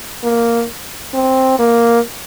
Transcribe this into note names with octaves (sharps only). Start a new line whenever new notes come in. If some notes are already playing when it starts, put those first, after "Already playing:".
A#3
C4
A#3